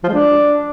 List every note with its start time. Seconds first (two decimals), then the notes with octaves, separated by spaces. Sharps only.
0.03 F3
0.08 G#3
0.14 D4